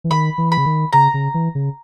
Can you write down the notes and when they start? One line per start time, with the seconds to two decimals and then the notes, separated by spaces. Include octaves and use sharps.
0.04 E3
0.10 D#3 B5
0.38 E3
0.52 B5
0.58 C#3
0.66 D#3
0.93 C#3 A#5
1.14 C#3
1.34 E3
1.55 C#3